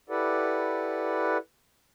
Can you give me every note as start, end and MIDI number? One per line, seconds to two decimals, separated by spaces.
0.10 1.37 64
0.10 1.37 67
0.10 1.37 69
0.10 1.37 71
0.10 1.37 74
0.10 1.37 78